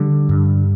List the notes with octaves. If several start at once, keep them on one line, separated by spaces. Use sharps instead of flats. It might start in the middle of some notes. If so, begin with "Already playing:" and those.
Already playing: D3 G3
G2